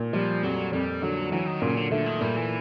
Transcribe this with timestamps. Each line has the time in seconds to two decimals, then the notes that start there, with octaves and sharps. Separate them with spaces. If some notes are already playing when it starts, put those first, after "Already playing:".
Already playing: A#2
0.13 F3 G3
0.43 F2 F#3
0.73 F2 G3
1.02 D3 F#3
1.32 E3 F#3
1.46 D#3
1.62 A#2 C#3
1.77 D3
1.91 D3 A3
2.06 D#3
2.21 A#2 G3
2.36 E3